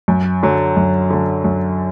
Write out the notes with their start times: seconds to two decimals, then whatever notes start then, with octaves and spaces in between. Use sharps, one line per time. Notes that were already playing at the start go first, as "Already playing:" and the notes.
0.08 F#2
0.43 D3 F#3
0.76 F#2
1.10 D3 F#3
1.44 F#2